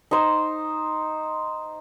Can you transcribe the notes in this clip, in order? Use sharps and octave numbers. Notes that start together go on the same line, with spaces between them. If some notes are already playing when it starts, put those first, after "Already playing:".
D#4 C5